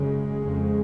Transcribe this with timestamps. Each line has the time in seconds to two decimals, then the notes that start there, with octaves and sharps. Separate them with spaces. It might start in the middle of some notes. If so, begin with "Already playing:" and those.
Already playing: F#2 C#3 G#3
0.41 F2 C#3